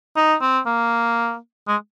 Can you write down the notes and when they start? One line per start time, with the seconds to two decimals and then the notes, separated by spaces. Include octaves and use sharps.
0.17 D#4
0.41 C4
0.66 A#3
1.68 G#3